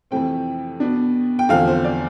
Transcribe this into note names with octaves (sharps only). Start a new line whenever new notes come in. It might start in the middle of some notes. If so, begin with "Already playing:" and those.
F2 C3 E3 A3 C4 G5
B2 B3 D4
G5
E2 D3 F3 A3 C4 F5
C5
D5